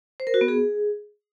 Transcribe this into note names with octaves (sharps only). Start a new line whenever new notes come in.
C5
A#4
F#4
B3
G#4